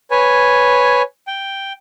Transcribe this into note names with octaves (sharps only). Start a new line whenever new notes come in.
B4 C#5 G#5
G5